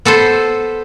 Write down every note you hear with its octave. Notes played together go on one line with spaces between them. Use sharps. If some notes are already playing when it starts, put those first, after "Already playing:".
B3 A4 B4 C5